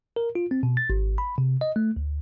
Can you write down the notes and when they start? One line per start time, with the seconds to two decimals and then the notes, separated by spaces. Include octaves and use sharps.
0.16 A#4
0.35 F4
0.51 C4
0.63 B2
0.77 A6
0.90 G#1
1.18 B5
1.38 C3
1.61 D#5
1.76 A3
1.96 D2